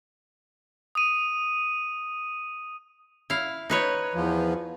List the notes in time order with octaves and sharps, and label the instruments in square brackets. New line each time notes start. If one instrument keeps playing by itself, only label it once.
[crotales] D#6 D#7
[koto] E4 F5
D#4 B4 C#5
[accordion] E2 F3